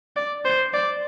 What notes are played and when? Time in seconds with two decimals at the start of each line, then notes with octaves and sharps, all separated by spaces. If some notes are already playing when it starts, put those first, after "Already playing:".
0.16 D5
0.45 C5
0.74 D5